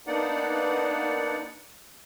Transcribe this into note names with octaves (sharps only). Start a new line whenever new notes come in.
A#3 B3 D4 D#4 D5 F#5